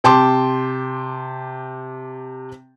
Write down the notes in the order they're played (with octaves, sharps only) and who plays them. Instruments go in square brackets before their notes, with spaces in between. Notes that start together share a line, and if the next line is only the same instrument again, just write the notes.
[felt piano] C3 G5 A5 C6 D6